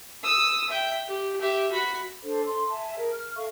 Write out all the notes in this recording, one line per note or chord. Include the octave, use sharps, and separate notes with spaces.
D#6 E6
E5 G5
G4
G4 E5
F#4 B5
D4 A4 C5
A4 C6
E5 G#5 A5
G#4 A#4
F6
A4 E5 F5 C#6